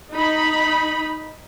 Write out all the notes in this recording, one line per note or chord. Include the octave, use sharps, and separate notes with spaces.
D#4 B5